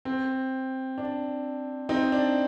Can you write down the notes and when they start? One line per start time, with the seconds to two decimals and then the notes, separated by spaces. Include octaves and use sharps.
0.05 C4
0.98 D4
1.89 C4 D#4
2.12 D4